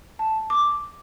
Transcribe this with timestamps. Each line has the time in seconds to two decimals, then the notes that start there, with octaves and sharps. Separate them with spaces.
0.19 A5
0.50 D6